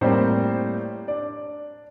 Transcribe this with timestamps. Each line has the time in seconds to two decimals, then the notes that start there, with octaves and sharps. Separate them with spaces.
0.01 A2 G3 A#3 C4 C5
1.08 D4 D5